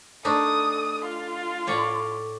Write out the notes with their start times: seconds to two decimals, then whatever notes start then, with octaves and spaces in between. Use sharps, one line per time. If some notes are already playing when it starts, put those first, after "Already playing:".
0.25 A3 D4 D#4 D#6
1.05 F4
1.67 A2 C#5 D5